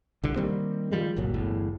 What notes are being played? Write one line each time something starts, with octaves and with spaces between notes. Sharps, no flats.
C2 D3
D#3 G3 A#3 C4
D#3 F3 G3 G#3
G1 C2 A#2 F#3
G1 E2 A2